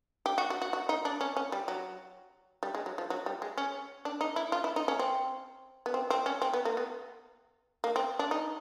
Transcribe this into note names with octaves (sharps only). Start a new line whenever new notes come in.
G4
F#4
F#4
F#4
F#4
D#4
D4
C#4
C#4
G3
F#3
G3
G#3
F#3
F3
F#3
G3
G#3
C#4
D4
D#4
E4
F4
E4
D#4
C#4
C4
B3
C4
C4
C#4
C4
B3
A#3
B3
A#3
C4
D4
D#4